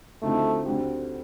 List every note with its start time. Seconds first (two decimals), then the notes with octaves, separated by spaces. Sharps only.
0.22 D2 D3 F3 A3 C4 D#4
0.65 D2 D3 A3 C4 G4